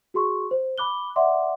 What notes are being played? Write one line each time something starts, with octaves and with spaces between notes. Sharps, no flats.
F#4 G#4 C6 C#6
C5
B5 D6 F#6 G7
D5 E5 F#5 C6 D6